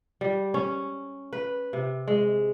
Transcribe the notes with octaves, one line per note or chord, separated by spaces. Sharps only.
G3
C#4
B4
C3
G#3